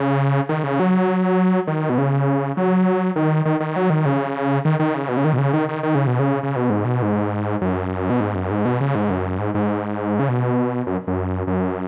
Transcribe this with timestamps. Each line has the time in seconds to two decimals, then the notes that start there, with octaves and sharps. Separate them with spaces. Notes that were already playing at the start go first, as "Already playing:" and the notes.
Already playing: C#3
0.49 D#3
0.64 C#3
0.80 F#3
1.67 D#3
1.89 B2
1.98 C#3
2.57 F#3
3.16 D#3
3.45 D#3
3.60 D#3
3.76 F#3
3.90 D#3
4.05 C#3
4.65 D#3
4.79 D#3
4.94 C#3
5.09 B2
5.17 C#3
5.25 D#3
5.33 B2
5.38 C#3
5.53 D#3
5.69 D#3
5.83 D#3
5.95 C#3
6.07 B2
6.19 C#3
6.43 C#3
6.56 B2
6.70 G#2
6.85 B2
7.02 G#2
7.61 F#2
8.10 B2
8.20 G#2
8.35 F#2
8.51 G#2
8.65 B2
8.80 C#3
8.95 G#2
9.10 F#2
9.39 G#2
9.54 G#2
10.19 C#3
10.29 B2
10.87 F#2
11.07 F#2
11.47 F#2